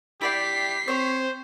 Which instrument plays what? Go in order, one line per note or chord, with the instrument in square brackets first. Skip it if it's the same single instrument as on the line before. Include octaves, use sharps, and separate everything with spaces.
[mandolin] E4 D5 G5 [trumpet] G4 [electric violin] B6 C7
[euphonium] C4 [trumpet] C5 [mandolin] C#5 C#6